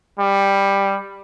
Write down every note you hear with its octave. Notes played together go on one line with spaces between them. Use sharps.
G3